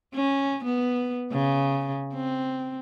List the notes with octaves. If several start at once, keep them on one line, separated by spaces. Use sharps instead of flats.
C#4
B3
C#3
C4